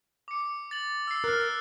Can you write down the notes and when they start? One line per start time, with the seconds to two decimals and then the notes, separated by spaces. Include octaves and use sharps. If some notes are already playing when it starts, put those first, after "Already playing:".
0.28 D6 C#7
0.71 A6 F#7
1.07 E6 C7
1.24 A#4 F6 F#6